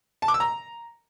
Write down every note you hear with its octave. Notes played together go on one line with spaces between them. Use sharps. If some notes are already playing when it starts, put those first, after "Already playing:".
A5
D6
E6
A#5